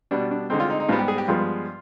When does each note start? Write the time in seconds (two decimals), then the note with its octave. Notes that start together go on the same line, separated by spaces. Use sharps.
0.11 B2 G3 B3 D4
0.31 D4
0.50 D3 G#3 C4 D#4
0.60 F4
0.70 D#4
0.80 D#4
0.89 G#2 G3 B3 F4
0.99 G4
1.08 G#4
1.18 G4
1.28 G2 F3 G#3 B3 F4